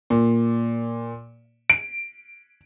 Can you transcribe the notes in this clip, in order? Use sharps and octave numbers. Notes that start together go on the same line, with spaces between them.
A#2
D7